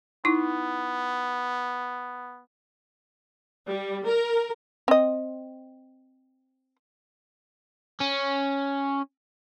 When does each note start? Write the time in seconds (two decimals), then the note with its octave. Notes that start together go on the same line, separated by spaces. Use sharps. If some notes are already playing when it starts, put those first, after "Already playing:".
0.25 B3 D#4 E4
3.67 G3
4.07 A#4
4.88 C4 D#5
8.00 C#4